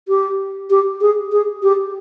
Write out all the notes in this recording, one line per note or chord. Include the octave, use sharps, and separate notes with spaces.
G4
G4
G#4
G#4
G4